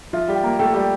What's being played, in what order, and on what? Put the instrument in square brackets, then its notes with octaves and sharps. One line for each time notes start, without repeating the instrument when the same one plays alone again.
[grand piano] F3 F4 [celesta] E5
[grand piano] G3 G4
[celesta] G5
[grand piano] A#3 A#4
[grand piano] A3 A4 [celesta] G5
[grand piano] G3 G4